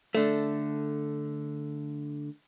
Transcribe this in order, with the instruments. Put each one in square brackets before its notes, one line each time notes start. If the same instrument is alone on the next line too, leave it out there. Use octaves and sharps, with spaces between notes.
[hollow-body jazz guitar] D3 A3